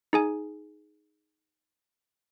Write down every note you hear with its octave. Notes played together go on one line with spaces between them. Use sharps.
D#4 G#4 G#5